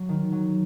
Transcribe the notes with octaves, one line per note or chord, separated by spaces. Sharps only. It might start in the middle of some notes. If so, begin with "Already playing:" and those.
Already playing: F#3
D#3
F#3